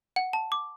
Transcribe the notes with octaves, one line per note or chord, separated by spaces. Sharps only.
F#5
A5
D6